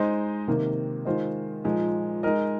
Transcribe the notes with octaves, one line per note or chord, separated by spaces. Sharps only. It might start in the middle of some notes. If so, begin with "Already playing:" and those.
Already playing: G#3 D#4 C5 D#5
C3 D#3 A#3
D#3 G#3 F4 C5 D#5
A#2 F3 G#3 D#4
G#3 D#4 A#4 D#5